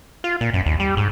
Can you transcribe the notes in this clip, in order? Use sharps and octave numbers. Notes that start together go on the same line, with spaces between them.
F4
A#2
F#2
D#2
G3
G#2